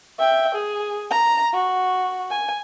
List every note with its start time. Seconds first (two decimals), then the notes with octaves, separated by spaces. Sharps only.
0.19 E5 G5
0.55 G#4
1.11 A#5
1.54 F#4
2.30 G#5